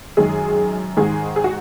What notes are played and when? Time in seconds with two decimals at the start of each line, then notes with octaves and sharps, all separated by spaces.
0.17 F#2 D#3 G#3 G#4
0.97 G#2 D#3 G#3 G#4
1.36 G#4
1.44 F#4